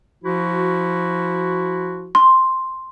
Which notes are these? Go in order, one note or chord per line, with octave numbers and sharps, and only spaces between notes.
F3 E4 F#4
C6